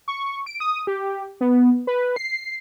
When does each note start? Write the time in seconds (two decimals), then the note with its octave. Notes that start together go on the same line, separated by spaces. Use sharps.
0.08 C#6
0.46 D7
0.60 D#6
0.87 G4
1.41 B3
1.87 B4
2.16 C7